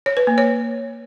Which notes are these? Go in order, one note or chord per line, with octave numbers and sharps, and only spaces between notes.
C#5
B4
A#3
C#5